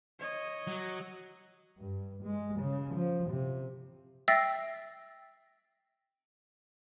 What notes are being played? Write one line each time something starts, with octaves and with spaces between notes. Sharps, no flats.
C#5 D#5
F#3
G2
G#3
C#3
F3
C3
E5 G5 E6 A6 A#6 C7